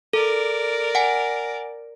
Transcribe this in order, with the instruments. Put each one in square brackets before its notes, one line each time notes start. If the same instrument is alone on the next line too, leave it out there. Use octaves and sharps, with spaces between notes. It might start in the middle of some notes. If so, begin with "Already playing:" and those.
[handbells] A4 [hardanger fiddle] A#4 D5
[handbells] F#5 G#5